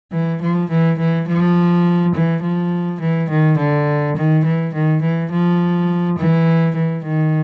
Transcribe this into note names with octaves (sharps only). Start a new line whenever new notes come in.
E3
F3
E3
E3
F3
E3
F3
E3
D#3
D3
D#3
E3
D#3
E3
F3
E3
E3
D#3